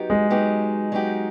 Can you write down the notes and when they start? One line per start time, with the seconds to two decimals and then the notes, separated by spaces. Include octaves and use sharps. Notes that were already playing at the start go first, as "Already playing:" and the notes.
Already playing: F#3 B3 D#4 G4
0.10 G#3
0.30 F#3 B3 D#4 G4
0.92 F#3 B3 D#4 G4